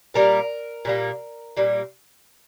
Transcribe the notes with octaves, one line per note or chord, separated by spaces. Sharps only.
A#2 G3 A#3 A#4
A#2 G3 A#3
A#2 G3 A#3